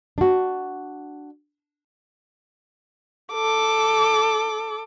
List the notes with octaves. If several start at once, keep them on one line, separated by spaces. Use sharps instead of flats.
D4 F#4
A4 D6